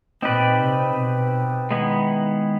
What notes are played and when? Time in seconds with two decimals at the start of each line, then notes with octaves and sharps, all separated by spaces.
0.22 A#2 C4 D#4 G4 B4 D5
0.60 C3
0.97 B2
1.71 D#3 G#3 B3 E4